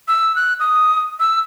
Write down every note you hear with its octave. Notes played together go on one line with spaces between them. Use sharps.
E6
F#6
D#6
E6